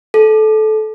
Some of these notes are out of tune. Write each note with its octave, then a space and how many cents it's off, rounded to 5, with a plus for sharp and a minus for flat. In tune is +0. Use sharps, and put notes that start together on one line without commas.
A4 -20